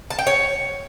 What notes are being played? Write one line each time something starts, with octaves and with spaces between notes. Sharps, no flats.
A5
G5
C#5